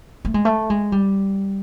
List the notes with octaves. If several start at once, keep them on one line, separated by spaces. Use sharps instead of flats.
A3
G#3
A3
G#3
G3